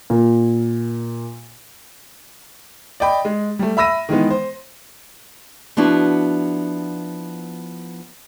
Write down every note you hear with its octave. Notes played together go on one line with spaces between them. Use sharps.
A#2
D5 D#5 G5 B5
G#3
G3 A3
E5 B5 E6 A#6 D#7
D#3 E3 G#3 B3
C5
F3 B3 D4 E4 F#4